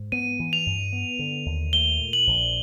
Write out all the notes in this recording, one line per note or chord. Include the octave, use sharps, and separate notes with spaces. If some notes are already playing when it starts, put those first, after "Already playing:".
Already playing: G#2
B3 D#7
E3
F7
G2
B3
D3
D#2
A3 G7
A#2
F#7
A#1